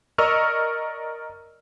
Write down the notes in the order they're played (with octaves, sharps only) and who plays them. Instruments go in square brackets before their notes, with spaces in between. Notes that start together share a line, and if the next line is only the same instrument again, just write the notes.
[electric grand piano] A#4 D5 D#5 C#6 E6 F6